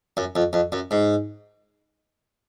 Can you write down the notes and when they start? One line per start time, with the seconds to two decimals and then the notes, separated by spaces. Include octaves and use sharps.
0.17 F#2
0.36 F2
0.53 F2
0.72 F#2
0.91 G#2